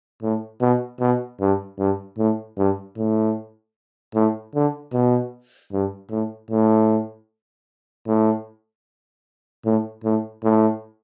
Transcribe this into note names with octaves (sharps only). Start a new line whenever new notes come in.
A2
B2
B2
G2
G2
A2
G2
A2
A2
D3
B2
G2
A2
A2
A2
A2
A2
A2